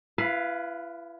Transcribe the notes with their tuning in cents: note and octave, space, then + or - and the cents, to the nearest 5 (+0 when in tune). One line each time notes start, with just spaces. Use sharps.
E4 +40 B4 +0 F5 +5